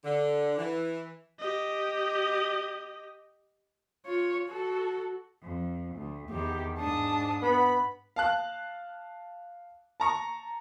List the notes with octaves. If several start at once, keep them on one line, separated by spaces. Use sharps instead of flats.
D3
E3
G4 D#5
F4 C#5
F#4 A4
F2
D2
E2 D#3 G4
G#2 D4 A5 D#6
B3 B5
F5 A5 F#6
A5 A#5 C#6